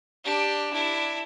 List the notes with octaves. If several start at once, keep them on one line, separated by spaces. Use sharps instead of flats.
D4 G4
D4 E4